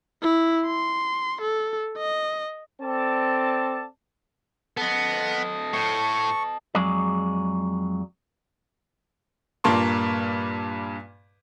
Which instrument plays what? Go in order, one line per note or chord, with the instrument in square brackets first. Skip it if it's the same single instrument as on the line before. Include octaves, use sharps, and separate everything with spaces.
[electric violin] E4
C6
A4
D#5
[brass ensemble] C4 A4 D5 A5
[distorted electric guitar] B3 [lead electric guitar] A4 D#5
[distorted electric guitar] A2 [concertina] C#6
[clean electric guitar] F2 F#3 G#3 G#4 D5
[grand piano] G2 A#2 A#3 A5 C6 C#6